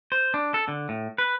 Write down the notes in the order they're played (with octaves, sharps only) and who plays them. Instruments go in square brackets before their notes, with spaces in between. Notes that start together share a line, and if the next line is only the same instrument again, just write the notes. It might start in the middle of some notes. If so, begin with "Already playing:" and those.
[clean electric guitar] C5
D4
A4
D3
A2
B4